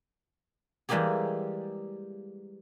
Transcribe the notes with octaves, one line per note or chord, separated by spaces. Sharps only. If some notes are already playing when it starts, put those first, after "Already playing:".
E3 G3 G#3 A#3 G4 G#4